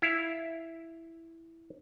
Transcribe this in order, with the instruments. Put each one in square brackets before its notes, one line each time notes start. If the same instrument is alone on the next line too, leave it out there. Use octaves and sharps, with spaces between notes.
[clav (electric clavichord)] E4 F5